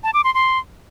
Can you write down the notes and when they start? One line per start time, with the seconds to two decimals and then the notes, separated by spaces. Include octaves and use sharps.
0.04 A5
0.14 D6
0.24 C6
0.34 C6